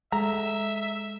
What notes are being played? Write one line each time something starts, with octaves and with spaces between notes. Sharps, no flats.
G#3 A4 E5 A#5